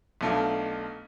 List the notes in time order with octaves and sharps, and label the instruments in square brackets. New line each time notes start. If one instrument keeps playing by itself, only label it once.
[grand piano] B1 B2 A3 D4 F4